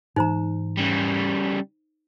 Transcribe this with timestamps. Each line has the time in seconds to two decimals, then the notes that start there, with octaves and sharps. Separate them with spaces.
0.16 G#2 E3 D#4 C5 A#5
0.77 C#3 G3